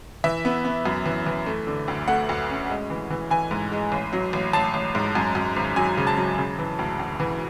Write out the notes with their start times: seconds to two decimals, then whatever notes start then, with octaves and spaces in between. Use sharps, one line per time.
0.24 E3 E5
0.45 B3
0.65 B3
0.86 F#2
1.06 E3
1.26 E3
1.46 A3
1.67 D3
1.88 D2
2.08 A3 F#5
2.29 D2
2.49 C#4
2.70 G#3
2.90 E3
3.10 E3
3.31 E3 G#5
3.51 G#2
3.72 G#3
3.92 A1
4.13 F#3
4.33 A1
4.53 A1 A5
4.74 A1
4.95 G#2
5.15 F#2
5.35 F#2
5.56 G#1
5.76 F#3 G#5
5.97 C#3
6.07 A5
6.17 F#3
6.38 C#3
6.59 E3
6.79 D2
6.99 D2
7.20 E3